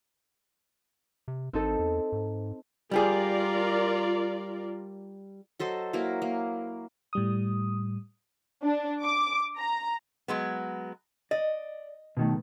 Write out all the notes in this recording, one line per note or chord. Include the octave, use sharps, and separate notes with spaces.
C3
G#1 C4 D#4 A4
E2
G#2
G3 F4 G4 G#4 A#4 D5
F#3 A4 C5 D#5
F#3 A#3 E4 A#4
A#3
A2 G3 D#6
D4
D6
A#5
F#3 G#3 B3
D5 D#5
B2 D#3 A3